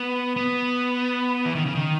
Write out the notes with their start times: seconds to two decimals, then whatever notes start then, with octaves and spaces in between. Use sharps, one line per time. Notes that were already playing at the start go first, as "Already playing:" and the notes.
Already playing: B3
0.36 B3
1.45 E3
1.55 D#3
1.65 C#3
1.75 D#3